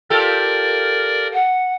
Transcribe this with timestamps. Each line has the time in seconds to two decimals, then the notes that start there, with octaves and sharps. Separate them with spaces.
0.10 F4 G4 A4 A#4 D5
1.34 F#5